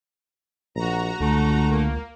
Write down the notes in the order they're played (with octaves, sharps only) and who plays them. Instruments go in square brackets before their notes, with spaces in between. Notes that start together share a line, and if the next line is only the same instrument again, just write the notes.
[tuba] A#1 [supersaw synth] F#4 A#5
[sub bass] C#2 [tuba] D3 [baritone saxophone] A3
[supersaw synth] A#3